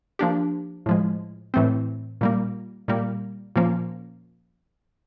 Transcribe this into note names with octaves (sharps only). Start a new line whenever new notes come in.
F3 A#3 D4 G4
A2 F3 G#3
A2 E3 A3 C4
A#2 G3 A#3
A#2 G3 A#3
A#2 F3 A#3 C#4